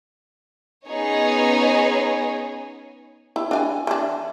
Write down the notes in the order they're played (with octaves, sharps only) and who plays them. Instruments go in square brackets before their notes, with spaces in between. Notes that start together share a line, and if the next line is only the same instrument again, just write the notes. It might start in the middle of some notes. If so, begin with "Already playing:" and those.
[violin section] B3 C#4 D#4 G#4 C#5
[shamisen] E4
D4 F5 G#5
E3 D4